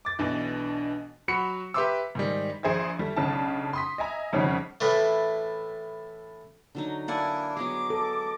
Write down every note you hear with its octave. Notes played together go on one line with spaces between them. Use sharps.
D6 A6
B1 B2 E3 D4
F#3 F#4 B5 C#7
G4 B4 E5 C6 D6 E6
G#2 D#3 G3
A#1 G#4 C5 E5 G#6
G3 A3
B1 C#3 D4 A5
C6 D#6 B6
D#5 E5 G#5 A#5
G#1 F2 C#3 G3 C#4 D#4
A2 E3 A3
D3 F#3 D#4
A#3 D4 E4 D5 F#5 G#5
F#3 B3 G#4 D#5 D6
A4